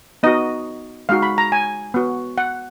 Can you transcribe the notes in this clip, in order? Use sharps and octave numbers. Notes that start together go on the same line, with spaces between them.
B3 D#4 F#4 D#5
G#3 D#4 F#4 F5
B5
A#5
G#5
B3 F#4
F#5